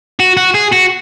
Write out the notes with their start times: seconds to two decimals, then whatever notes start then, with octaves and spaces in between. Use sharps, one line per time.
0.20 F#4
0.37 F#4
0.55 G#4
0.73 F#4